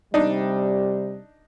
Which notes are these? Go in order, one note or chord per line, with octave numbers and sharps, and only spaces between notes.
C3 G3 D4 D#4